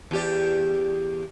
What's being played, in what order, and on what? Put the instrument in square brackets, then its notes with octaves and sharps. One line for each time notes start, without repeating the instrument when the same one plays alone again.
[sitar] E2 G4 D5